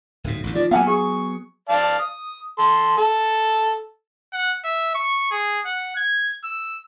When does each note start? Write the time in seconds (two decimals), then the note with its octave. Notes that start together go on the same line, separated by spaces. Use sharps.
0.24 D1 G#2 B2
0.43 A1 F2 D3
0.55 D#3 F3 D5
0.71 F#3 A#3 B3 F5 F#5 G#5
0.87 G#4 C#6
1.69 D5 F5 A5
1.99 D#6
2.59 A4 C6
2.97 A4
4.33 F#5
4.65 E5
4.95 C#6
5.31 G#4
5.65 F#5
5.96 G#6
6.44 E6